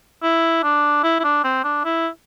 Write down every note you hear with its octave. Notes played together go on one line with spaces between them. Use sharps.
E4
D4
E4
E4
D4
C4
D4
E4